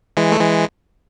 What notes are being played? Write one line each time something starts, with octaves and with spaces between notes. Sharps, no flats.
E3 G#3
A3
E3 G#3